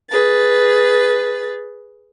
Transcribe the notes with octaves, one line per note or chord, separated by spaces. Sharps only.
G#4 B4 A6